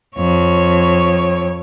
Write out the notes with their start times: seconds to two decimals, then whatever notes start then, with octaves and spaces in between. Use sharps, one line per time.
0.16 F2 C#5